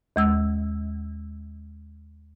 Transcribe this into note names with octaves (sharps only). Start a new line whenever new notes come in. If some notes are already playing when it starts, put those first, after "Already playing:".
D#2 G#3 E6